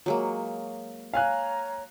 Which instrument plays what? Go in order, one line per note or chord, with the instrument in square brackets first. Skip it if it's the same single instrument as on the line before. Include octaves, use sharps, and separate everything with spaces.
[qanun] F#3 G#3 A#3
[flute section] C#5 A#5 [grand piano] F5 G#5 F#6